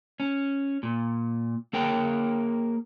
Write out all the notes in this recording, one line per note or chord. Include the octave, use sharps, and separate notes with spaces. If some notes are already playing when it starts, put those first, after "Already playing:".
C#4
A#2
A#3 G#4 A#4 C#5 G5